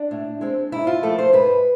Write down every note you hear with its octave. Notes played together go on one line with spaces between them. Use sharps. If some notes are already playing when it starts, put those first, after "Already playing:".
Already playing: D4
A2
G#3 C4
G#2 E4
F4
F3 A3 A4
C5
G#2 B4